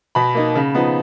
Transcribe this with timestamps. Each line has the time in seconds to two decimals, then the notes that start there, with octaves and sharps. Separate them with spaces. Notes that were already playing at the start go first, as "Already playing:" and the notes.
0.15 B2 B5
0.35 A#3 D#4
0.55 C#3
0.75 F3 B3 D#4